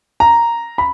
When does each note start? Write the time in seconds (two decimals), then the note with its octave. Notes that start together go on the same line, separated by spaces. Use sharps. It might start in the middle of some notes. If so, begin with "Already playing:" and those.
0.20 A#5
0.78 B5